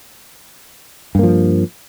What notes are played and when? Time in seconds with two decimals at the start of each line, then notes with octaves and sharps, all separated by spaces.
1.15 G2
1.19 A#3
1.23 F3